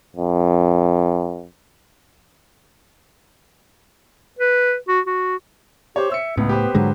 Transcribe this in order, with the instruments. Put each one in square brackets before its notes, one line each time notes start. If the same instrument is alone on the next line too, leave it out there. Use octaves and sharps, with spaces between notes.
[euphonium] F2
[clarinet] B4
F#4
F#4
[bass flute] G4 [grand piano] C5 C#5
[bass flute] E5 [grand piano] E6 C#7
[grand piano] C#2 [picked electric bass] A2 [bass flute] B3
[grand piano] G4 B4 C5
[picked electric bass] G#2 D3 G#3 [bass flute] F#3